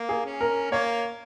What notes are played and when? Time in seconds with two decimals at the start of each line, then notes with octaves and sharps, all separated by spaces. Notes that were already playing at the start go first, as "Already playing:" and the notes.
Already playing: A#3
0.09 G#4
0.25 C#4
0.41 A#4
0.71 A#3 C#5